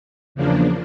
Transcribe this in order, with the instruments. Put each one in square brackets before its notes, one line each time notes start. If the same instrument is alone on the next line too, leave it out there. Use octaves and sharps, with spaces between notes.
[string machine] E2 C#3 F3 A#3 D4